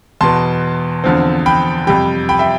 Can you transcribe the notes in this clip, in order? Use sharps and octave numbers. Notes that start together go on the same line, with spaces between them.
E2 B2 B3 A5 C6
E2 D3 F3 C4
G5 B5
F2 C3 G3 G5 B5
G5 B5
E5 G5